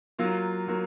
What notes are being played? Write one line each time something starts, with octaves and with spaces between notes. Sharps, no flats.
F#3 A#3 F4 F5
F#3 A#3